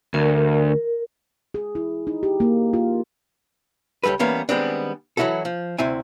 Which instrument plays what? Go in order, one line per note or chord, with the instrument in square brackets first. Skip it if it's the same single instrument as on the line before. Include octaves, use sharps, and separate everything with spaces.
[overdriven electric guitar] D2 [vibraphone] A#4
[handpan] G#4
E4
D#4
G4
A#3
F4
[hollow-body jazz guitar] C#2 G2 G3 A4 B4
E3 G3 A#3 B3 C#4
D#3 G3 G#3 B3 C4 D4
E3 F#3 G#3 E4 F#4 A4
F3
D2 C3 C4 E4 G#5